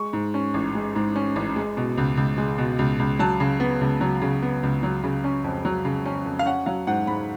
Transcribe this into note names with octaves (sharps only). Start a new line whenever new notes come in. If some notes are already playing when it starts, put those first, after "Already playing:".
Already playing: G#3 C#6
G#2
C#4
A1
G#3
G#2
C#4
A1
G#3
B2
C#2
C#2
G#3
B2
C#2
C#2
F#3 A5
C#3
B3
C#2
F#3
C#3
B3
C#2
F#3
C#3
C#4
F2
F#3
C#3
C#4
F2
F5
C#4 F#5
F#3 F5
G#2 F#5
G#2 B5